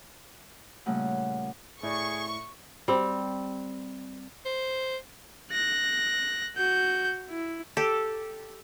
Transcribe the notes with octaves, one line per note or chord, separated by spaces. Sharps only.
A#2 C#3 G3 A3 F#5
A2 G#4 D5 C#6
G3 C4
C5
F#6 A#6
F#4 G6
E4
G4 A4